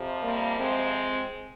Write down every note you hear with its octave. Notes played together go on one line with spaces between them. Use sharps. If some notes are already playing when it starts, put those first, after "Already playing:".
Already playing: F2 C3 F3
G3 A#3
G#3 C4